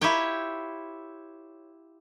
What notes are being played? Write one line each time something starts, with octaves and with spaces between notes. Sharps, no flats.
E4 F4 G4 C#5 G5